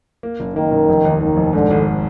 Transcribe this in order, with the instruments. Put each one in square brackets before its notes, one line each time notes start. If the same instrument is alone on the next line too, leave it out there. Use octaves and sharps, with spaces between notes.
[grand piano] A#3
F#1
[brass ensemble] D#3 [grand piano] A#3
[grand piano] F#1
F1
D#2
[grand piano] D#2 [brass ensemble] D#3
[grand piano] F1
[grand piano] G#2 [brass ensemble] D3
[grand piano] G#1